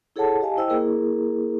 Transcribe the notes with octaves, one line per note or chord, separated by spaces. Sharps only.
E4 G#4 A4 C#5 F#5 A5
G4 D#5 F5 G#5 A5
E4 C5 D#5 G5 E6
A#3 E4 G#4 A#4